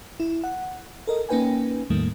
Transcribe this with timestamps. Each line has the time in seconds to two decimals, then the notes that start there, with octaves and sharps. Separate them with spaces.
0.20 E4
0.44 F#5
1.07 A4 A#4 D#5
1.29 A#3 C#4 D#4 B4 G5 G#5
1.90 E2 A2 D#3 G3 A3 A#3